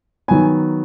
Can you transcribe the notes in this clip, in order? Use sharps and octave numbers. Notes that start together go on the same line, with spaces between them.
D#3 F#3 B3 G#5